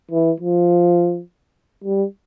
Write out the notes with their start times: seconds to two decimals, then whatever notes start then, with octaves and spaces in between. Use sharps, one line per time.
0.11 E3
0.40 F3
1.84 G3